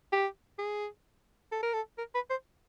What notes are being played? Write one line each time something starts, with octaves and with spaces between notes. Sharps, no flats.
G4
G#4
A4
A#4
A4
A#4
B4
C5